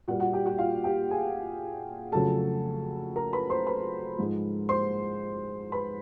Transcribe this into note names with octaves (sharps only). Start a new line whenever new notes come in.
A#2 G3 A#3 F#4 F#5
F#4 F#5
G4 G5
F#4 F#5
F4 F5
G4 G5
G#4 G#5
F2 C#3 F#3 A3 A4 A5
A#4 A#5
B4 B5
C5 C6
B4 B5
G#2 F3 G#3
C5 C6
B4 B5